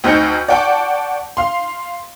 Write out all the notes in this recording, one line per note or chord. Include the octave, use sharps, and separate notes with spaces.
D2 C4 D#4 A5 G6 C#7
D5 F#5 G5 A5 C#6 D6
F5 C6